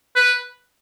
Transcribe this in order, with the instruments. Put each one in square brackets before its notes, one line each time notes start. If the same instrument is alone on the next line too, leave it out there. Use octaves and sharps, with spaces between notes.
[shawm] B4